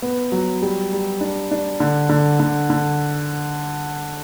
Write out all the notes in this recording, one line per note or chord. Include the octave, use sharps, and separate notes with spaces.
B3
F#3
G3
G3
D4
D4
D3
D3
D3
D3